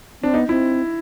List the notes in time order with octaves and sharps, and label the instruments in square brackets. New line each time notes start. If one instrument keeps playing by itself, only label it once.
[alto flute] C4 [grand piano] D4
[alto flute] B3 [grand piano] D#4
[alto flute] C4 [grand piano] E4